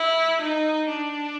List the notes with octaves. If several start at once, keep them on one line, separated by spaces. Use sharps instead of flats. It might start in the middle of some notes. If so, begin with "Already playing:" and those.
Already playing: E4
D#4
D4